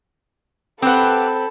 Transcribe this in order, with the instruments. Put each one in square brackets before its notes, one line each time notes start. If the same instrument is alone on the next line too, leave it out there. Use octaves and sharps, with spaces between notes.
[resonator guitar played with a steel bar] C4 [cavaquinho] G4 B4 F#5 [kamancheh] A4 B5